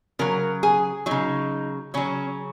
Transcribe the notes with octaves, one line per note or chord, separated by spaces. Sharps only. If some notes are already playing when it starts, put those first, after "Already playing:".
C#3 F#3 A#4
G#4
C#3 F#3 D#4
C#3 F#3 C#4